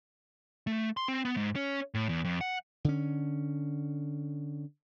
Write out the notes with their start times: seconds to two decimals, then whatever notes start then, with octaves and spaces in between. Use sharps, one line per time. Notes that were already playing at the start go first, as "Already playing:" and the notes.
0.67 A3
0.97 C6
1.08 C4
1.25 B3
1.37 G#2
1.56 C#4
1.94 A2
2.09 E2
2.24 F2
2.41 F#5
2.85 D3 C#4